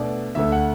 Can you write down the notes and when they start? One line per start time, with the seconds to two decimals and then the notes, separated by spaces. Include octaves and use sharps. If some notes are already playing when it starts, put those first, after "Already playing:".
Already playing: B2 A3 D4 D5
0.35 D2 D3 A3 E5
0.52 F#5